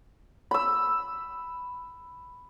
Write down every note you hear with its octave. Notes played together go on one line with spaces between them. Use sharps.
B5 E6